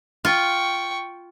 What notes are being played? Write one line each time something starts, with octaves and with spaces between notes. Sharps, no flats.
F4 G5 C#6